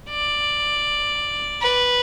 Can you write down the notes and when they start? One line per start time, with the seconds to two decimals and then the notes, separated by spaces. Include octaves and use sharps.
0.10 D5
1.62 B4